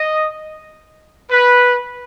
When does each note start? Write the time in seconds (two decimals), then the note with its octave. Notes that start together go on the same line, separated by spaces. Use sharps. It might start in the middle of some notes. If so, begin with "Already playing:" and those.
Already playing: D#5
1.31 B4